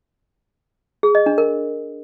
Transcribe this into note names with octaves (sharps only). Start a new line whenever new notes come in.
G#4
D#5
D4
A#4